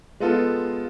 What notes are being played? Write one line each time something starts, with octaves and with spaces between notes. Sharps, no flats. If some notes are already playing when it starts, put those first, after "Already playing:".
G#3 B3 F4 A4